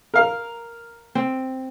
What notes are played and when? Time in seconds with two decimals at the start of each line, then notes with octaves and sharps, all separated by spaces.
0.14 A#4 F5
1.15 C4